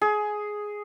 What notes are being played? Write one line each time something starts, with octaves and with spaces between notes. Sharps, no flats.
G#4